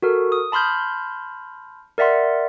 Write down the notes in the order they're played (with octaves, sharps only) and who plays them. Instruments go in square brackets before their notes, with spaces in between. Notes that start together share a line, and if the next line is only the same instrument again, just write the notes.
[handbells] F#4 A4 A#4
D#6
A5 B5 C6 F6 G6
A#4 D5 E5 F#5 C6